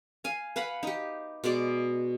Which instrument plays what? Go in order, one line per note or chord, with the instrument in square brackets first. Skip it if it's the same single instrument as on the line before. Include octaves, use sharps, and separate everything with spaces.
[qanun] F5 G#5
B4 F5 F#5 B5
D#4 G4
B2 G#3 D5 D6